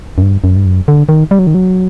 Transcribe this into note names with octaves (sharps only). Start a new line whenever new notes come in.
F#2
G2
F#2
G2
F#2
D3
D#3
G3
F#3
D#3
F#3